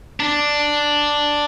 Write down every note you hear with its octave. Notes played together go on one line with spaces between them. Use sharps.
D4